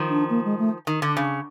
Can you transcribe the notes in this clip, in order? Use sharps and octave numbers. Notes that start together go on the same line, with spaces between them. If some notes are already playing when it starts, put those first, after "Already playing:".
Already playing: D#3 F3
D4
A#3
G#3
A3
D#3
D3
C#3